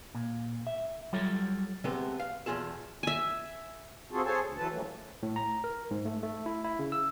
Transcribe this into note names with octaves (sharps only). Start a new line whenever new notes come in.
A#2
E5
F#3 G3 F4 A4 C#5
C3 G#3 A3 B3 C4 A4
F5
E2 B2 D3 F4 G#4 A4
E5 G#5
C4 F4 F#4 G#4 A4
G#4 A4 C5 C#5 G#5 A5
D2
E3 F#3 A4 B4 A5
F3 G3 A3 A#3 C#4
A2
A#5
A#4
G#2
A3
A3
E4
E4
C#3
E6